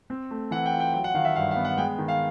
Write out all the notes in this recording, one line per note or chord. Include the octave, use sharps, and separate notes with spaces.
C4
A3
E3 F#5
G5
F4
G5
F#3 G5
F#5
D#3 F5
E5
G2 F5
F5
B3
F#5
G#3 G5
D#3
F5